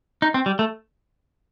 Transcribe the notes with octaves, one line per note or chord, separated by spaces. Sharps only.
D#4
C4
G3
A3